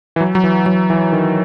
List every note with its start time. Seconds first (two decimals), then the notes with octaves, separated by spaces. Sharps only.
0.16 E3
0.20 F#3
0.35 F#3
0.44 E3
0.66 F#3
0.90 E3
1.12 D#3